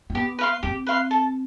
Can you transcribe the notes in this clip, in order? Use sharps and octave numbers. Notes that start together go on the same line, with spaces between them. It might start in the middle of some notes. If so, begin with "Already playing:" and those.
C4
B3 G4
B4 F5 C6
C4 G4
B4 F5 C6
A4